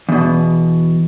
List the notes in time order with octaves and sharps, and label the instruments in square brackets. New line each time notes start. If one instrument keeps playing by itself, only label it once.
[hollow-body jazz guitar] E2 B2